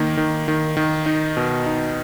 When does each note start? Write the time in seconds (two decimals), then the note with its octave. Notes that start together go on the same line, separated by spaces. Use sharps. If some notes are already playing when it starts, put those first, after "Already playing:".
Already playing: D#3 A#3
0.17 D#3
0.48 D#3
0.77 D#3
1.06 D#4
1.37 B2
1.66 D#4